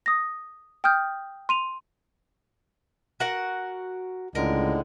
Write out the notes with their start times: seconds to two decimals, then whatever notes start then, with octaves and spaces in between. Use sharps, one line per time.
0.06 D#6 A#6
0.84 G5 D#6 F6 G6
1.49 C6 D#7 F7
3.20 F#4 A#4 F#5
4.35 C#2 A2 D3 G#3 A#4